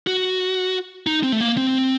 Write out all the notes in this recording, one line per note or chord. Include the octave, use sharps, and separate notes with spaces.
F#4
D#4
C4
A3
A#3
C4